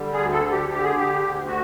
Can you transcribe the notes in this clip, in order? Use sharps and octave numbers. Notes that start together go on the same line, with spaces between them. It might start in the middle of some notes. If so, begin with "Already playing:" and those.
Already playing: D3 G3
G#4
D2
A4
D3
G4
D3 G4
G#4
D3 G4
D2
D3 F#4